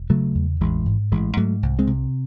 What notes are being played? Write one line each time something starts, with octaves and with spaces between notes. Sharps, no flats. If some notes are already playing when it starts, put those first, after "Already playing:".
Already playing: E1
C#3 F#3 A3
E2
A1 E3 G#3
G#2
A1 E3 G#3
G#2 F#3 A3
C2
G#3 C4
C3